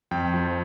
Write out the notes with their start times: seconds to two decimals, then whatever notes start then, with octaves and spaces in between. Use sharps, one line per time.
0.11 F2 G5
0.34 F3